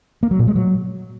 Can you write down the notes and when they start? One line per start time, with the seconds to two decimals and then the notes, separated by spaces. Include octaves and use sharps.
0.23 A#3
0.31 F#3
0.39 A#2
0.47 G#3
0.56 F#3